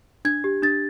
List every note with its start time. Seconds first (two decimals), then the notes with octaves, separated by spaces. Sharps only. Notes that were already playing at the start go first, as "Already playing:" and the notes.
0.25 D4 G#6
0.44 G4
0.63 D4 A6